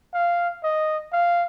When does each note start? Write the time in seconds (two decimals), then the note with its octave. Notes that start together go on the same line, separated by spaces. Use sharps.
0.14 F5
0.64 D#5
1.13 F5